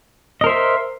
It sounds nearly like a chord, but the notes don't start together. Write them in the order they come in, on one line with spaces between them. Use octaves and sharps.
D#5 A#4 C5 E5